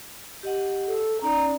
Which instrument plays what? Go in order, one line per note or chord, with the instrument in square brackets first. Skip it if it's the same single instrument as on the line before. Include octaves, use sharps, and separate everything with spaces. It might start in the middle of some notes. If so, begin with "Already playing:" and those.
[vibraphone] G4 D#5 F#5
[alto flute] A4
[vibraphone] C#4 D#4 D5 [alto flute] A#5